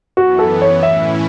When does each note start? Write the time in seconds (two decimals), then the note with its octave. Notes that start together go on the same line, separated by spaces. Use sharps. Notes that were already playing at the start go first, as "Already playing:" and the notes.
0.17 F#2 E3 B3 F#4
0.39 A4
0.62 C#5
0.83 A2 E3 C#4 E4 E5